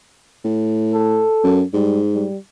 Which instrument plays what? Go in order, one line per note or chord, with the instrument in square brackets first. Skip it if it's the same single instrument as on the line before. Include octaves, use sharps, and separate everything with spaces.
[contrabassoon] A2
[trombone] A4
[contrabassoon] F#2
[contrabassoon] G#2 [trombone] G3
[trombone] G3